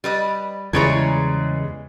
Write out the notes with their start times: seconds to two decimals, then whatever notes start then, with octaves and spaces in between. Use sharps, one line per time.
0.04 G3 B4 D#5
0.73 E2 C#3 E3 G3 G#3 C#5 A#5 G#6